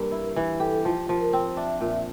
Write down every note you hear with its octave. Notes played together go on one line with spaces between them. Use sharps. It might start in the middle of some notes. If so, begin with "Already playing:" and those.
Already playing: G2 A#3 A#4
E4
E3
G4 A4
F3
F3 A#4
A#4
C4 C5
C5
D4 E5
A#2 E5